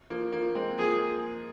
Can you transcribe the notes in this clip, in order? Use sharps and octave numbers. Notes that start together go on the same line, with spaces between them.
F3 A#3
F3 A#3
G#3 C4
F3 A#3 G#4